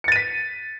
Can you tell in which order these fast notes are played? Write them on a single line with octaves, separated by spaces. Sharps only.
C#7 A6 D#7 B6